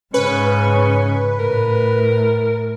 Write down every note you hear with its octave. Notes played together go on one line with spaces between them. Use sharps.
G#2 C#3 C#4 B4
A2 A#4